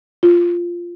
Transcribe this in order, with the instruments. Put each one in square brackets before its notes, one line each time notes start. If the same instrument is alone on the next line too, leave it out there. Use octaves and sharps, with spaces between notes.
[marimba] F4